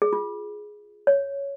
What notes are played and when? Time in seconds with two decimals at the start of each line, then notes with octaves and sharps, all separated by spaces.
0.02 G#4
0.13 F4
1.07 C#5